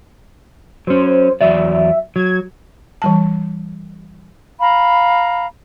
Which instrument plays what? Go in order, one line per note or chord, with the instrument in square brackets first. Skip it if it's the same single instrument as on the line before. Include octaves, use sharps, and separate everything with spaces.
[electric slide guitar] F#3 C#4 [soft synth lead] C5
[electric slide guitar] E2 F#3 D5 [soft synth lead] E5
[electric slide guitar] F#3 [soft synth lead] G#6
[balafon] E3 G3 A5
[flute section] F5 A#5 B5